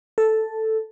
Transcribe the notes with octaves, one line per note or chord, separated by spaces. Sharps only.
A4